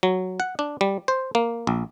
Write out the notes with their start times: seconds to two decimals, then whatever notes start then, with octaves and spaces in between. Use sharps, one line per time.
0.03 F#3
0.40 F#5
0.59 D4
0.81 G3
1.08 C5
1.35 A#3
1.67 A#1